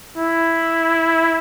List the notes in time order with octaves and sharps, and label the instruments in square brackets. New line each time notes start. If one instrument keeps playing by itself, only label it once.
[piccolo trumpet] E4